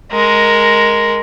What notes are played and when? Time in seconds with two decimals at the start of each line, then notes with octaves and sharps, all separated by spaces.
0.12 G#3 A#4